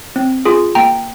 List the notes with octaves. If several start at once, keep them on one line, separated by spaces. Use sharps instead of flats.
C4
F4 G#4
A#3 G5 A#5